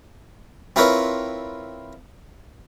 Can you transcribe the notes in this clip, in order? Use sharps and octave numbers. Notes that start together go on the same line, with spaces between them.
C4 E4 F4 A#4 B4 C#5